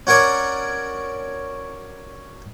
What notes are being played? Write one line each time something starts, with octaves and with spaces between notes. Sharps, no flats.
C#4 F#4 A#4 C#5 D5